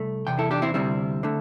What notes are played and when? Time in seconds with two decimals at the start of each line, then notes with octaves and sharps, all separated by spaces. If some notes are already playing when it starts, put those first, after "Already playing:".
Already playing: C2 A3
0.27 E2 C3 G5
0.39 E4 A4
0.51 D4 G4
0.62 C4 E4
0.74 D2 C3 G3 C4 E4
1.23 D3 A3